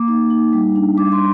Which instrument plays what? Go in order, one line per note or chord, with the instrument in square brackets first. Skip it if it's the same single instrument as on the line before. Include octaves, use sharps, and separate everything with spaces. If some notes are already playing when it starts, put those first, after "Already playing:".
Already playing: [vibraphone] A#3 D6
D#4
D#4
G3
D4
G3 D6
C6